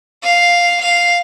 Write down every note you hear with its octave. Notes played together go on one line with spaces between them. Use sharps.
F5
F5